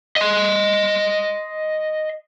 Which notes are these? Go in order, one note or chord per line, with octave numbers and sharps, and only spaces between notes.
D#5 C6